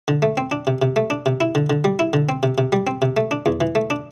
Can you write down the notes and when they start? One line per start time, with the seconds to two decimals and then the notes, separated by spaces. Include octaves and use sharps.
0.08 D3
0.22 A3
0.37 C4
0.51 D4
0.67 C3
0.82 C3
0.96 A3
1.10 D4
1.26 C3
1.41 E4
1.55 D3
1.70 D3
1.84 G3
1.99 E4
2.13 D3
2.29 C4
2.43 C3
2.58 C3
2.72 G3
2.87 C4
3.02 C3
3.17 A3
3.31 D4
3.46 E2
3.61 E3
3.75 A3
3.90 D4